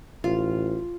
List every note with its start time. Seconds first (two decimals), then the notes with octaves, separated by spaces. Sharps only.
0.24 A1 F4